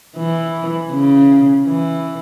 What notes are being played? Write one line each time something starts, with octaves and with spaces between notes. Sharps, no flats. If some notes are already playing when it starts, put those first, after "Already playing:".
E3
C#3
E3